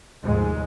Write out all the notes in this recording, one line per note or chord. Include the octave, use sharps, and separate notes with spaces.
F1 D#2 G#2 G#3